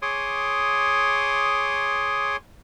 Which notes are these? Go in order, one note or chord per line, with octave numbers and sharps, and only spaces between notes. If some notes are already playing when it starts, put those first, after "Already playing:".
G#4 C#5 C6 D6 D#6